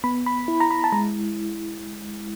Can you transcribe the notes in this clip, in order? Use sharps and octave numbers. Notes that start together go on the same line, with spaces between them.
B3 B5
B5
E4
A#5
B5
A5
G#3 A#5